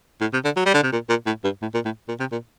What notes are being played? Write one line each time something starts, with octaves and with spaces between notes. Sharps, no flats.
A2
C3
D3
F#3
G3
D3
C3
A#2
A#2
A2
G2
A2
A#2
A2
A#2
C3
A#2